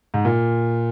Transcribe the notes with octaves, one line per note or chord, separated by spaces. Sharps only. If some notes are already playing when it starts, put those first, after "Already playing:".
G#2
A#2